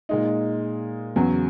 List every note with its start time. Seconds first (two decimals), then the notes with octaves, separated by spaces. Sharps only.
0.09 A#2 G#3 D#4
1.16 E2 C#3 F#3